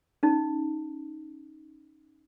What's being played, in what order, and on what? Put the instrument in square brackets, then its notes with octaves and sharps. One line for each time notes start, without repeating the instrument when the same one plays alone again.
[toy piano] C#4 D#4